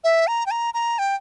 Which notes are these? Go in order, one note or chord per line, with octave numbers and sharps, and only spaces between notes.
E5
A#5
G5
A#5
A#5
G5